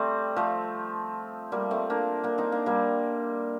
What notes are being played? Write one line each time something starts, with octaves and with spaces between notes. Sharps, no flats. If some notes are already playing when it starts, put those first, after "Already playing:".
Already playing: G3 A3 C4
F3 A3
G3 A#3
A3 C4
A#3 D4
A#3 D4
C4 D#4
A#3 D4
G3 A#3